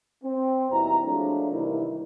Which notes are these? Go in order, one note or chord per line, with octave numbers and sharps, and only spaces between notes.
C4
D#2 B2 G3 C4 E4 A#5
F3 F#3 G#3 A3 D4
C3 D#3 E3 G3 A#3 E4